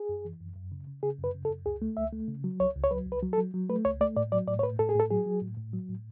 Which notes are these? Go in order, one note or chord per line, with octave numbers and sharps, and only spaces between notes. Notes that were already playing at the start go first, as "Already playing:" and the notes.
Already playing: G#4
F#2
E3
F#2
F#2
C#3
C#3
C#3 G#4
F#2 B4
C#3
A4
F#2
C#2 G#4
A3
C#2 E5
A3
C#3
F#3
C#2 C#5
C#2
C#5
F#3 B4
C#2
B4
F#3
A4
F#3
F#3
A3 B4
C#2 C#5
A3 D5
A2 D5
F#3 D5
A2 D5
C#5
A2 B4
A2 A4
G#4
A2 A4
F#3 G#4
F#3
A2
A2
F#3
A2